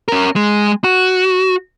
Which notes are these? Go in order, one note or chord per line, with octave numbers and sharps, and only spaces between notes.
C#4 A#4
G#3
F#4